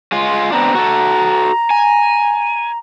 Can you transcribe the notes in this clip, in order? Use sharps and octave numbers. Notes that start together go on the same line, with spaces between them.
G#3 F4
B3 C4 D4 A#5
F#4 A4
G#5